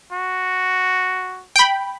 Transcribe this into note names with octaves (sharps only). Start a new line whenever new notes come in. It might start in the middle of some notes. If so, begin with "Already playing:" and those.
F#4
G5 B5